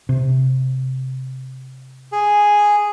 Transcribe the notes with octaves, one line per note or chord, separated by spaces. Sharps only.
C3
G#4